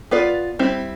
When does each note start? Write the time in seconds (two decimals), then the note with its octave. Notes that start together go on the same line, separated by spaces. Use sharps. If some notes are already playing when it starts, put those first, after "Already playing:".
0.11 B3 F4 B4 D5
0.59 G3 C4 E4